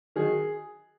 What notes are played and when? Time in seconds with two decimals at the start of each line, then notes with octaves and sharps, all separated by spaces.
0.16 D#3 F#3 G#4